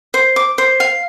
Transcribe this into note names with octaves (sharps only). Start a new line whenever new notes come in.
C5
D6
C5
F5